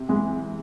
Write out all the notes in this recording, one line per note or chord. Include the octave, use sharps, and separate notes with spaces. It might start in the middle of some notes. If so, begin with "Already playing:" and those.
Already playing: C3
E3 G#3